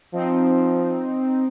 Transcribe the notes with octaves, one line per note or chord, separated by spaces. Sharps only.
F3 C4 D#4